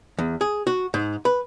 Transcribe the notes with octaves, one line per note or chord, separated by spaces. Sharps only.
E2
G#4
F#4
G#2
B4